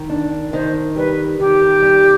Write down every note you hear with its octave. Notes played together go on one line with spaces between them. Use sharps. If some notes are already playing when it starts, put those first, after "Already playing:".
Already playing: D#3
D4
D#3 C5
G3 B4
D#3 G4
G3